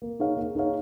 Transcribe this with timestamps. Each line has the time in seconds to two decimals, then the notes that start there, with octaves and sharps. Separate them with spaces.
0.02 A#3
0.19 D#4 G#4 C#5 F5
0.37 A#3
0.55 D#4 G#4 C#5 F5